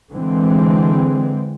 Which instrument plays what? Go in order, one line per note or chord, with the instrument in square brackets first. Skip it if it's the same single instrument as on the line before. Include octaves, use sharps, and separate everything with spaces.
[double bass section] D3 E3 G#3 C4